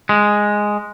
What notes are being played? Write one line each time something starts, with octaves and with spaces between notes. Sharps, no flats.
G#3